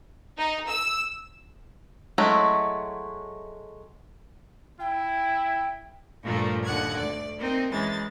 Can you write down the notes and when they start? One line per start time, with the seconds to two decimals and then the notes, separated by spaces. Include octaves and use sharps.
0.38 D#4
0.69 E6
2.18 F#3 G#3 A3 C#4 E4
4.80 E4 G5
6.21 G2 A#2 F3 A3 A#3
6.64 D#2 D3 F#5 F#6 G#6
6.96 D2 D5
7.37 A#3 C4 D#4
7.71 F#2 E3 G#3 A6